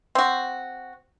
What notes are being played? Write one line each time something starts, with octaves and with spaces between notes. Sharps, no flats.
C4 F#4